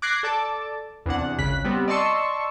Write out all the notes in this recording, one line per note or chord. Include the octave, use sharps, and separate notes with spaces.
D6 F#6 G#6 A#6 C7
A4 D5 A5 D6
E2 C3 D4 F#5
G#1 C#2 C#3 F#6 B6
G3 B3 C4
D5 D#5 A5 C6 C#6 E6